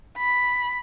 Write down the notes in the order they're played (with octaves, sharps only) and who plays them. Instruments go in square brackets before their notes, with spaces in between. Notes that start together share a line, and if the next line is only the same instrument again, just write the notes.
[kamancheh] B5